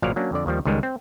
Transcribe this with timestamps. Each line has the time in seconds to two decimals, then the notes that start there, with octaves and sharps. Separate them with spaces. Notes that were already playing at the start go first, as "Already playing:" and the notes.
0.02 G#1 A#2 F3 F#3 D5 F5
0.16 F#3 A#3 C#4 D4
0.32 F2 D3 D5
0.46 D#2 D#3 F3 G3
0.65 C#2 D#3 G3 G#3
0.83 C4